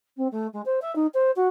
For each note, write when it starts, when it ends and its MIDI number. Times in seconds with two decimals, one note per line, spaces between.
0.17 0.28 60
0.32 0.47 57
0.53 0.62 56
0.65 0.79 72
0.81 0.94 76
0.95 1.07 63
1.14 1.31 72
1.36 1.48 66